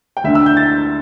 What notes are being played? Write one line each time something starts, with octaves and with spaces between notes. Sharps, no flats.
G5
D2 D3 E5
E6
G6
A6